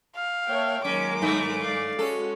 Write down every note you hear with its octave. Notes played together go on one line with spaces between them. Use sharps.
F5
A#3 C#5 E5 G5 A5
D#3 F#3 G#3 A#3 C#4 D6
G2 A3
D5 F5
G#3 C#4 F#4 A4